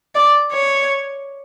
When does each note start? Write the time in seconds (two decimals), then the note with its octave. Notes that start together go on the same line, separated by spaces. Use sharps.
0.15 D5
0.52 C#5